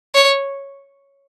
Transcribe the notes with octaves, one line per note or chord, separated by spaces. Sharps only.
C#5